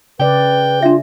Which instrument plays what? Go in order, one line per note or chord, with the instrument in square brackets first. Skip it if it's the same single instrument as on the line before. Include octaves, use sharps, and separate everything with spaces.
[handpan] C#3 D5 [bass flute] B4 [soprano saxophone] G5
[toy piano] D4 E5 [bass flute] F4